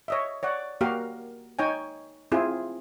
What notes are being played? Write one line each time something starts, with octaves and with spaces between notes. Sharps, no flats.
C#5 D#5 E5
C#5 D5 F#5
A#3 F#4 G4 A#4 F5
D#4 C#5 G5 G#5
C4 E4 F4 G#4